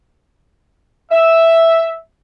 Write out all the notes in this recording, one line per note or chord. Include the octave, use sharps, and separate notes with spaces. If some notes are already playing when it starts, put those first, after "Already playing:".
E5